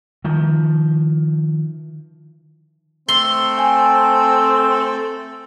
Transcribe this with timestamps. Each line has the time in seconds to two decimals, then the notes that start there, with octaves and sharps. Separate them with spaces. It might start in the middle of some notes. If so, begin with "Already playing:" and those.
0.24 D#3 F3
3.08 A3 C4 A4 C6
3.58 G5 G#5